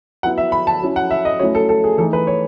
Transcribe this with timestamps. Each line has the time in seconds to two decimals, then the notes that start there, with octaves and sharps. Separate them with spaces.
0.23 F#3 B3 E4 F#5
0.38 E5
0.52 B5
0.67 A5
0.82 F#3 C#4 E4
0.96 F#5
1.11 E5
1.25 D#5
1.39 F#3 A3 C#4 E4 C#5
1.55 A4
1.69 A4
1.84 G#4
1.98 E3 A3 D#4 A4
2.13 B4
2.27 C#5